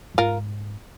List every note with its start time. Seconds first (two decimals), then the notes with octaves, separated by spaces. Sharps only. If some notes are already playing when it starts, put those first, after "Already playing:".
0.14 F2
0.18 G#2 F4 A#4